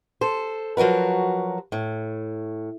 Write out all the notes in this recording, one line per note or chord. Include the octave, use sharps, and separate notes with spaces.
A4 C5
F3 F#3 F#4 A#4 B4
A2